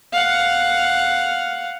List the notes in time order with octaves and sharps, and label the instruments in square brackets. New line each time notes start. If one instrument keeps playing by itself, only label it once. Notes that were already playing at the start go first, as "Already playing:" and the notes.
[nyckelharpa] F5 F#5